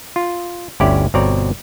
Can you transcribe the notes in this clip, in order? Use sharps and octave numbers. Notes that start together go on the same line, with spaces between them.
F4
G1 D2 C#4 E4 G4 D5
G1 B2 C4 C#5 D5 A#5